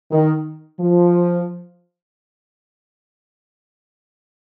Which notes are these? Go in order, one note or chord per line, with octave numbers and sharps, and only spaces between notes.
D#3
F3